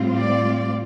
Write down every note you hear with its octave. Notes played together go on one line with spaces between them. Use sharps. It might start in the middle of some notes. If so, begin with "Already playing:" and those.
Already playing: A2 G3 C4 F4
D5